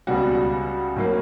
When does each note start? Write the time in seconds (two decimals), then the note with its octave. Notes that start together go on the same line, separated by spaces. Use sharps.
0.07 C#2 B2 G3 F#4
0.96 A2 F#3 A#3